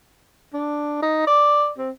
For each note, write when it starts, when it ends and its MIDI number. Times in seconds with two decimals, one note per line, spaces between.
0.53 0.99 62
1.02 1.24 63
1.27 1.67 74
1.78 1.90 60